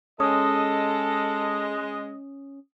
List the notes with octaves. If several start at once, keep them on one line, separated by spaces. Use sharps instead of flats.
G#3 C#4 A4 D#5 D#6